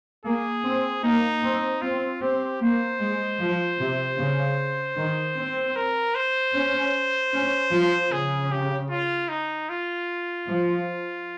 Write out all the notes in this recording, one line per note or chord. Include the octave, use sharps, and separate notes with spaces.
A#3 G#4
C4
A#3 D#4
C4
C4 F4
C4 G4
A#3 C5
G#3
F3
C3
C#3
D#3
C4
A#4
C5
C#4
C#4
F3
C#3 G#4
G4
F4
D#4
F4
F3